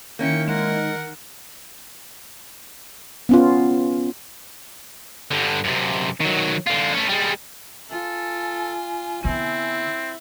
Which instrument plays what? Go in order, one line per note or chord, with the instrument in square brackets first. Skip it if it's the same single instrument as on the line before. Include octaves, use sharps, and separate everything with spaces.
[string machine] D#3 [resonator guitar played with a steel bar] A#3 C#4 E4 [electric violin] G5 C#7
[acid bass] G#3 [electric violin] A#4 F#5
[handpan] B3 C#4 F4
[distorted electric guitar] G2 D3
F#2 C3
D#3 F#3
D3 F4
A3 C#4
G3 G#3
[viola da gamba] F4 [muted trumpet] A4 [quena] G#5
[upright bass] D3 B3 [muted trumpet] C4 [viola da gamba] E4